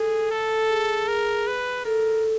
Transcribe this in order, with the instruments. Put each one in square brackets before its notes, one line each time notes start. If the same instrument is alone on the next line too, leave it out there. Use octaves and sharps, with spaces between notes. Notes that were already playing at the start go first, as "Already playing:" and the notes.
Already playing: [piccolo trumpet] G#4 [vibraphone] A4
[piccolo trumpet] A4
[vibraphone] G#4
[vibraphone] G#4 [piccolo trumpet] A#4
[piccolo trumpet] B4
[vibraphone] A4 [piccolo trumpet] A#4